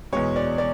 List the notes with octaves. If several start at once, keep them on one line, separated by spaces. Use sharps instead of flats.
E2 B2 G#3 C#5
D5
D5